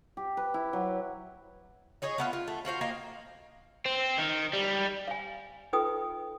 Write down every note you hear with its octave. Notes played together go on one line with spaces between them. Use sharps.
G4
B4
E4
F#3
D#4 G#4 C#5 D#5
A3 B3 F4
F4
A3
F4 F#4 C5 F5
A#3 D#5 F5 G5
C4
D#3
G3
F5 G#5
D#4 F4 A4 B4 G5 D#6